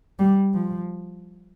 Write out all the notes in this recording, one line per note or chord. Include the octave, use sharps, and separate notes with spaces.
G3
F3